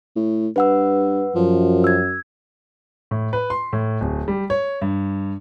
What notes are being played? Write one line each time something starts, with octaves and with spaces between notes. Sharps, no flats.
A2
G2 B4 F#5 E6
F#2 F3
E6 G#6
A2
B4
C6
A2
D1
G3
C#5
G2